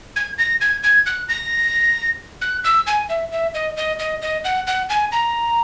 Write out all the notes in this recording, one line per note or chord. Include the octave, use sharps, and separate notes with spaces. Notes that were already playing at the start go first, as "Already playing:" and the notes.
G#6
A#6
G#6
G#6
F#6
A#6
F#6
E6
G#5
E5
E5
D#5
D#5
D#5
D#5
F#5
F#5
G#5
A#5